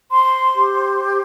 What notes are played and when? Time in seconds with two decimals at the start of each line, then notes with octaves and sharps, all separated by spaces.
0.11 C5 C6
0.56 G4